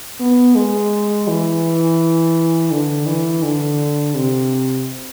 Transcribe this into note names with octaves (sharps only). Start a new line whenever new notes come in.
B3
G#3
E3
D3
E3
D3
C3